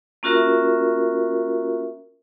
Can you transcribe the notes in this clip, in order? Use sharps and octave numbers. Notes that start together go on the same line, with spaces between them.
A#3 C#4 F4 F#4 A#4 E5